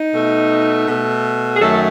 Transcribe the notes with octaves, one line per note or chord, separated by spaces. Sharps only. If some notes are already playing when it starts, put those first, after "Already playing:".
Already playing: D#4
B2 A3
B2 A3
G#4
F#2 D#3 F#3 A3 A4